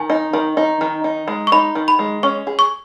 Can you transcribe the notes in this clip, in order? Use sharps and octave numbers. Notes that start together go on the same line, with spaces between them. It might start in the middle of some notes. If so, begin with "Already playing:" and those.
Already playing: D#3 G#5
D#4
D#3
D#4
D#3
D#4
G#3
C#6
D#4 B5
D#3
B5
G#3
C#4 C#6
G#4
C#6